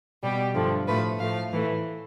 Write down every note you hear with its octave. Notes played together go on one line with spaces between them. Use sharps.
B2 G3 G4
G2 D3 F3 A3
A2 F3 A3 B4
A2 F3 A3 F5
A2 E3 A3